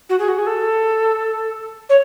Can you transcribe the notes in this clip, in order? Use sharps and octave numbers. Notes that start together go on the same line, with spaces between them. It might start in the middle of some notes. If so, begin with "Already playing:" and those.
F#4
G#4
F#4
G#4
A4
C#5